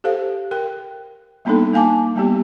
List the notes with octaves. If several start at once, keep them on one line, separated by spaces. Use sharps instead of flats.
G4 A4 C5 F5
A#4 G5
G3 A#3 B3 D4 D#4 A4
A#3 F5 G#5 A5 D6
G3 A#3 B3 G4